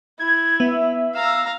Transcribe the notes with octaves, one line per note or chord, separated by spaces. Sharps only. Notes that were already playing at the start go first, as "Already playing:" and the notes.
E4 G#6
B3 E5
F5 A#5 E6